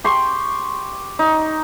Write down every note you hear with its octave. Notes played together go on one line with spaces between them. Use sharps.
G4 C6 C#6
D#4